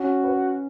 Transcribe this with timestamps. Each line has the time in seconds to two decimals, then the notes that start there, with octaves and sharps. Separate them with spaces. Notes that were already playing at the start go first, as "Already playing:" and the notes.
Already playing: C#4 F#4
0.24 B4